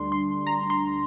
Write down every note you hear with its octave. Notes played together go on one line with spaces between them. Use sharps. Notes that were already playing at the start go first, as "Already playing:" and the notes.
Already playing: D2 D3 G3 D4 C6
C6
A#5
C6